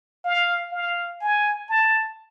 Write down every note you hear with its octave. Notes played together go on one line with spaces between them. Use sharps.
F5
F5
G#5
A5